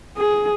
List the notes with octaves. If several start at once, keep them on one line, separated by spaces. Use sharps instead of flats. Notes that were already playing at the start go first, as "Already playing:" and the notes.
G#4